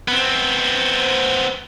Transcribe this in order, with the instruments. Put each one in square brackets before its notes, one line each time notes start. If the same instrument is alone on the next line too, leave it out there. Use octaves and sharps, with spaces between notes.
[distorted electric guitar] B3 C4